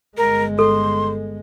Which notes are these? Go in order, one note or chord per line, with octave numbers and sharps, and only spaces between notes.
G1 G#3 A#4
A4 C6